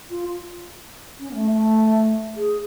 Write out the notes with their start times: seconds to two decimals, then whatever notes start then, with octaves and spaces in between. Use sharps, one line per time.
0.10 F4
1.19 C#4
1.31 B3
1.35 A3
1.51 A3
2.36 G#4